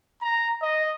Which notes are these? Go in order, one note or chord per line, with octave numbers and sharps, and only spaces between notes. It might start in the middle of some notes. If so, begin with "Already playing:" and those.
A#5
D#5